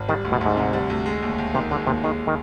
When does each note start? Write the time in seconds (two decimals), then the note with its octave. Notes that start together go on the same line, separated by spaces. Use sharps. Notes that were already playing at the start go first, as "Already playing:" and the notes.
Already playing: G#1
0.08 D#3 G3
0.25 D2
0.32 B2
0.41 D2 G#2
0.57 C3
0.73 G3
0.90 D2
1.06 G#3
1.22 D#2
1.38 D#2
1.55 C3 D#3
1.71 D3 G#3
1.87 D#2 C3
2.03 D#3 G#3
2.27 D#3